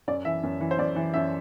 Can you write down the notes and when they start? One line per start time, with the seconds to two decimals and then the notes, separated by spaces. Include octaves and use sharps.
0.08 F#2 D5
0.25 E3 E5
0.43 F#2
0.61 E3
0.71 C5
0.78 F#2 D5
0.96 E3
1.14 F#2 E5